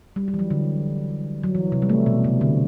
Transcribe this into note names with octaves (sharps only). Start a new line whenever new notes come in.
G3
G3
E3
F#3
D3
F#3
E3
C3
G3
A3
B2
C3
D3